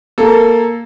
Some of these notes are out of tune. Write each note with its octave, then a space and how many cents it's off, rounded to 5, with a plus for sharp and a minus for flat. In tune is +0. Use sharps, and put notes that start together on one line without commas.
A#3 +0 A4 +0